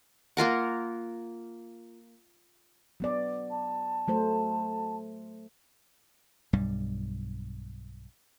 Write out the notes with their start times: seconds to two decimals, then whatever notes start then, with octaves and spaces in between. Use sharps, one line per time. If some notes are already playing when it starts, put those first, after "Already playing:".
0.37 A#3 F4 A#4 F#5
3.00 F#3 B3 D5
3.51 A5
4.08 F#3 A3 C5
6.53 B1 G2 G3